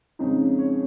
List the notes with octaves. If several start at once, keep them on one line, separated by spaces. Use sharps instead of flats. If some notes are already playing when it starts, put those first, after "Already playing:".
F2 C#3 G#3 D#4
C#5